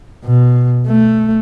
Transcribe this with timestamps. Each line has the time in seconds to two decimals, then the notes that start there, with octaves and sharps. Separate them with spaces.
0.24 B2
0.88 A3